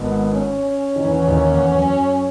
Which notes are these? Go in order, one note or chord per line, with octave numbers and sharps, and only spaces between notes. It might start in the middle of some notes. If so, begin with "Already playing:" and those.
Already playing: G#1 G#2 B3
C#4
D#3
E2 E3
D#2 D#3
E2
E2
F#2